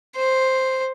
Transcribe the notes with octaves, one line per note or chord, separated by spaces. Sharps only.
C5